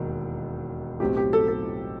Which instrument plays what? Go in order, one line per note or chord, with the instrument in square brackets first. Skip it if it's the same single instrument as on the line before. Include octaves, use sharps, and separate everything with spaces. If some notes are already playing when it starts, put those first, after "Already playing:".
Already playing: [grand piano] E1 D#2 D#3
[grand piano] B1 A2 F#3 C4 [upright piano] G4
[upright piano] G4
A4
A4